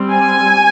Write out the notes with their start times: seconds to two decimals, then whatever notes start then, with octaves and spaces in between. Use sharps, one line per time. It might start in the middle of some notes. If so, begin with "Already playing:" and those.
Already playing: G3 C4
0.12 G#5